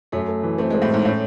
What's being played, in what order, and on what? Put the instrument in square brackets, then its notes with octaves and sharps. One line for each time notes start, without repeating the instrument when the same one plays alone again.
[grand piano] F#2 [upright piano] A3
[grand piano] A3
E3
[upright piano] A3 [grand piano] C4
[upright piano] G#3
[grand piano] C4
[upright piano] A2
[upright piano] G#2 [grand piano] A3
[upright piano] A2 [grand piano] C#4